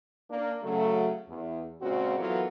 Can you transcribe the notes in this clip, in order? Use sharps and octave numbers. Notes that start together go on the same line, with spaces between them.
A#3 D4
C#3 F#3 A3
E2
A#2 C#3 G#3 C4 F#4
E3 F#3 B3 F4 A4 A#4